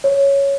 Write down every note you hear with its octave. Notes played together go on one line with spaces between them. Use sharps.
C#5